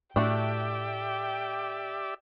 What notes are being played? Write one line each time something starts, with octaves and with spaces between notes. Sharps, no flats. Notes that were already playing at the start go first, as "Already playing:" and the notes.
A2 A3 D4 F#4 G4 D5 E5 G5